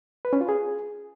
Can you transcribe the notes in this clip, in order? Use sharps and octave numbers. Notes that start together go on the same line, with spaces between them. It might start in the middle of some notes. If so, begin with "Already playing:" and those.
B4
C#4
F4
G#4